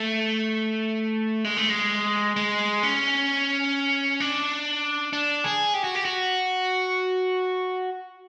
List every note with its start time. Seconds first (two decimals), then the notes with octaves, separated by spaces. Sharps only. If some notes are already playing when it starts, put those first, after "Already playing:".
Already playing: A3
1.44 G#3
1.57 A3
1.70 G#3
2.36 G#3
2.83 C#4
4.20 D4
5.13 D4
5.44 G#4
5.74 G4
5.84 F#4
5.95 G4
6.05 F#4